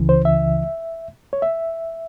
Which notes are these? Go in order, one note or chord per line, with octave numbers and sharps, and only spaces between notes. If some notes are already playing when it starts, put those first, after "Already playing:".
Already playing: C#2 C#3 E3
C5
E5
C#5
E5